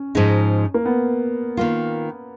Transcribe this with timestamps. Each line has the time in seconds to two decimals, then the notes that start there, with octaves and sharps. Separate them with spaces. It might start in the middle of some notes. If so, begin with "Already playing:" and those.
Already playing: C#4
0.15 G#2 F3 G#3 D#4
0.74 A#3
0.85 B3
1.57 D#3 A#3 F4